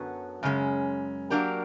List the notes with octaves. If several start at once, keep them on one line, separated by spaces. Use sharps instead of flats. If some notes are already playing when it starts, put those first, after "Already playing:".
Already playing: F#2 D3 F#3 B3
F#2 C#3 G#3 C#4
F#3 A#3 D4 G4 A#4